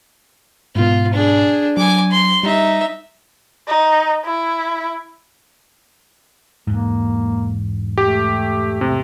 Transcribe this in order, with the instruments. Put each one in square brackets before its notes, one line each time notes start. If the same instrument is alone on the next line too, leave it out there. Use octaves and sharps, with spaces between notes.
[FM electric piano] G#2 B2 [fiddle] F4
[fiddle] D4 G#4
[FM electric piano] F#3 [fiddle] G#5 D6
[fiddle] C6
[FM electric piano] G3 [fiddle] D#4 E5
[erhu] D#4
E4
[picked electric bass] E1 G#2 [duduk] A#3
[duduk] A3 [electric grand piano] G4
[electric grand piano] C3